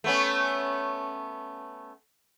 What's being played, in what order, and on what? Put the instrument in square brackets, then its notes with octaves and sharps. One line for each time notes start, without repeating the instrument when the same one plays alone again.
[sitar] A3 B3 C#4